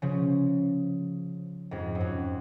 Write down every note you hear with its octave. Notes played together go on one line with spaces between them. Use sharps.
C#3 F3
F2 G#2
F#2
F2